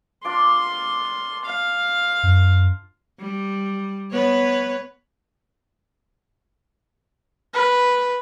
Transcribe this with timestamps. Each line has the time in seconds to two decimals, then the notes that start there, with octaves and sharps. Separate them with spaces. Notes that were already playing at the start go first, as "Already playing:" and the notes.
0.25 D4 F4 C6 D6
1.45 F5
2.23 F#2
3.20 G3
4.12 B3 B4 C#5
7.54 B4